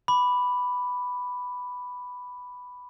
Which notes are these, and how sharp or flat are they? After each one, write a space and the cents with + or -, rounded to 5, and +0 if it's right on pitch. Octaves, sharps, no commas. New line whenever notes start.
B5 +0 D6 +0